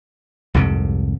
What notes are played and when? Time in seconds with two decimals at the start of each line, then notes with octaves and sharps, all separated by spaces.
0.54 C2 F2 G#2 C3